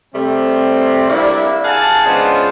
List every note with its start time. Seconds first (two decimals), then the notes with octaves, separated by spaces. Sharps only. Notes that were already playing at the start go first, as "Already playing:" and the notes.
0.15 C3 G3 A3 C4
1.10 G3 A#3 D4 E4
1.64 G#4 F5 F#5 G#5 A5
2.06 C#3 G#3 B3 D4 F4 C5